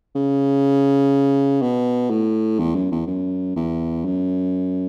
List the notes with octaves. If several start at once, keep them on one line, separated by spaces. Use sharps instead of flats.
C#3
B2
A2
E2
F#2
E2
F#2
E2
F#2